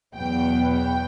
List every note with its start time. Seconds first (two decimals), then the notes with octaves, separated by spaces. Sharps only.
0.16 E2 B2 F#3 B3 G5
0.74 G5